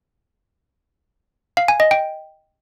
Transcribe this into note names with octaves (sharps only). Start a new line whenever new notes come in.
F5
G#5
D#5
G5